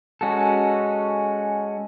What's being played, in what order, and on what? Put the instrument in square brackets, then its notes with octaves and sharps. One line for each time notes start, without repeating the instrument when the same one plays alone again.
[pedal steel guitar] G#3 C#4 F#4 A4